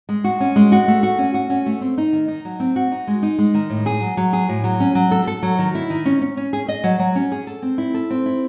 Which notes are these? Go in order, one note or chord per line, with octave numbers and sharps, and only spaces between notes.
G#3
F#4
C#4
G#3
F#4
A3
F#4
C#4
F#4
C#4
A3
C4
D#4
D#3
D#4
F#3
C4
F#4
D#4
G#3
D#4
G#3
D#3
A2
G#4
F#3
F#3
G#4
A2
F#3
C#4
F#3
A4
A4
F#3
D#3
E4
D#3
C#4
C#4
C#4
G#4
D#5
F#3
F#3
C#4
G#4
A4
C4
E4
A4
C4
E4